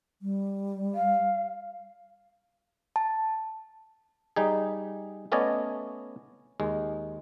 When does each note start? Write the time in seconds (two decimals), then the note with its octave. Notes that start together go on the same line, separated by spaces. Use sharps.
0.22 G3
0.95 F5
2.96 A5
4.36 G3 D#4 G#4
5.32 A3 B3 C#4 D5 D#5 G#5
6.60 D#2 G#3